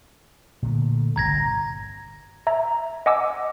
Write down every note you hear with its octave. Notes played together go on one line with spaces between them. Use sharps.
A#2 D3 A3
G1 C2 A#5 G#6 A#6
E5 A#5 G#6
D#5 F#5 G#5 D6 E6